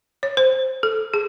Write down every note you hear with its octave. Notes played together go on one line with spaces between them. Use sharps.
C#5
C5
A4
G#4